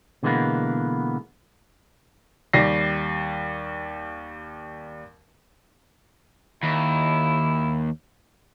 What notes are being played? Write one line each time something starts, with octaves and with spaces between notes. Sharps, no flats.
B2 D3 E3 G#3 A#3 B3
D#2 G3 A#6 C7
D#2 E4